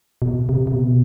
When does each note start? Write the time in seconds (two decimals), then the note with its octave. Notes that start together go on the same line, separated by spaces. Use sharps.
0.22 B2
0.49 C3
0.67 C3
0.74 B2